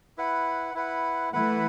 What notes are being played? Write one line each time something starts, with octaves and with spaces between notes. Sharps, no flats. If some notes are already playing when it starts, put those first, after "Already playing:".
E4 B4 F#5
E4 B4 F#5
E3 A3 E4 B4 F#5